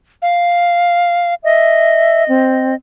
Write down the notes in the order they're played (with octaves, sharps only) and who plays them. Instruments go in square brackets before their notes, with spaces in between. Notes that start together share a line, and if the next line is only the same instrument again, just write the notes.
[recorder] F5
[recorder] D#5 [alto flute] E5
[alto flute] C4